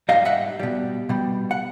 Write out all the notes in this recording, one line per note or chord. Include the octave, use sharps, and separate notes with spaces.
G#2 E3 G3 D#5 F5
E5 F#5
B2 G3
B2 G3
F#5